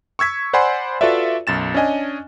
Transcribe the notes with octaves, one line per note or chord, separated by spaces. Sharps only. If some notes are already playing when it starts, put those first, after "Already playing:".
C#6 E6 G#6 B6
C5 D5 F#5 G#5 B5 C6
F4 F#4 A4 B4 D5 E5
B1 F#2 A6 E7
C#4 D4 D#5 G#5